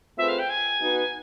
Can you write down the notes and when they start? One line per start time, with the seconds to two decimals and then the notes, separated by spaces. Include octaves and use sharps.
0.17 A3 C4 F4 G#4 B4 E5
0.28 F5
0.39 G5
0.49 G#5
0.81 B3 D#4 F#4 B4